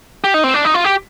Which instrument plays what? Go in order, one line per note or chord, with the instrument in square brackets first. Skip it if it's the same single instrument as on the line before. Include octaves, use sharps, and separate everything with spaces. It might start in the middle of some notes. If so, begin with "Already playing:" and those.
[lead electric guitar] G4
D#4
C4
D4
D#4
F4
G4